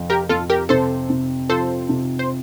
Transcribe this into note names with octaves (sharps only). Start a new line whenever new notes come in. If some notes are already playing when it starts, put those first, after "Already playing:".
Already playing: F2 C3 F3
G4 A#4
F2 F4 A4
G4 A#4
C3 A4 C5
C3
F3 A4 C5
C3
C5